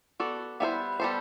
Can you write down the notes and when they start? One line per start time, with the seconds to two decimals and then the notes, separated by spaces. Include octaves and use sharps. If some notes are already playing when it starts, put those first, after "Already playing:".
0.20 B3 F#4 A4 D5
0.60 G3 B3 E4 A4 C5
1.00 G3 B3 E4 A4 C5